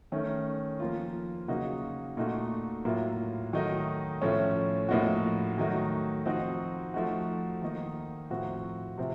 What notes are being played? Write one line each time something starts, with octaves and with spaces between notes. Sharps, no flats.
D#3 A3 C#4
F3 A#3 F4
C#3 F#3 A#3 D#4 F#4
A#2 A3 D#4 F#4
A2 F#3 A#3 F4
D#3 F#3 A3 D#4 F#4
A2 F3 A3 C#4
A2 F3 A#3 D#4 F#4
D#3 F#3 A3 D#4 F#4
F3 C4 D#4 F#4
F3 A3 D#4 F#4
D#3 A#3 D#4
A2 F3 C4 F#4
C3 F3 C4